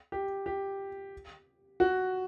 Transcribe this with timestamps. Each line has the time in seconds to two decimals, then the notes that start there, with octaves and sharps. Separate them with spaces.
0.12 G4
0.46 G4
1.80 F#4